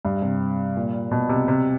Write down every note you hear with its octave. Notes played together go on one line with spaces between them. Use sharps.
G2
C3
A#2
B2
C3
C3